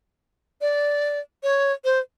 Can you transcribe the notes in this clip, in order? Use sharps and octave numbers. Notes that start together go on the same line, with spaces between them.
D5
C#5
C5